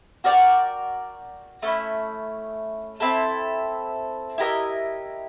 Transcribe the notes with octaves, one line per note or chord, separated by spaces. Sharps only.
F#4 A#4 D5 G5
A3 C#4 E4
C4 E4 A4
E4 G4 A#4 D#5